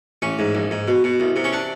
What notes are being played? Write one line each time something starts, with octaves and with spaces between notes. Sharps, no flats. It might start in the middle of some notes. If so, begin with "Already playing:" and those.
A1 C#4
G#2
A#1
G#2
B2
B2
C2
C3
C#4
D4